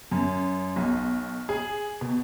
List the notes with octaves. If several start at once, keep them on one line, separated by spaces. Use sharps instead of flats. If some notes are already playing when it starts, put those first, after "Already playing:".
F#2
B1
G#4
B2